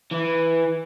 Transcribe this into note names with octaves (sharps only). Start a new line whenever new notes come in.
E3